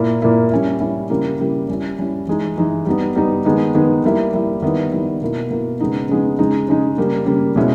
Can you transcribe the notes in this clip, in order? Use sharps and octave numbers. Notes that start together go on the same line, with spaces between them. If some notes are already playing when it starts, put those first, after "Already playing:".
Already playing: A#2 A#3 E4
A#2 A#3 E4
G3 C#4 E4
G3 C#4 E4
C#3 G3 A#3 E4
C#3 G3 A#3 E4
G3 C#4 E4
G3 C#4 E4
E3 G#3 D#4
E3 G#3 D#4
G3 B3 D#4
G3 B3 D#4
D#3 G#3 B3 D#4
D#3 G#3 B3 D#4
G3 A#3 E4
G3 A#3 E4
D#3 G3 B3 E4
D#3 G3 B3 E4
B2 A#3 E4
B2 A#3 E4
C#3 G#3 B3 D#4
C#3 G#3 B3 D#4
C#3 G#3 D#4
C#3 G#3 D#4
C#3 G3 A#3
C#3 G3 A#3
B2 G#3 C#4 E4